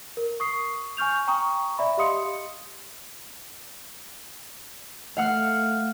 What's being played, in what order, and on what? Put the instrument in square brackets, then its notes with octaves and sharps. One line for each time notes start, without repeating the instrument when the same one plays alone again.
[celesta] A#4
C#6 D#6 C7
G#5 C#6 F6 G6 F7
G5 A#5 C#6 D#6
D5 E5 B5
G4 D#5 F5 C6 D#6 C#7
[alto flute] A3 [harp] F5 F#5 F6